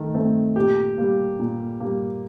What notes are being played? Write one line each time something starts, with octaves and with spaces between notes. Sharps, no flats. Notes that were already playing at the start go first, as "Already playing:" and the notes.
Already playing: D#3 A3
A3 C4
A#2 G4
G3 A#3
A#2
G3 A#3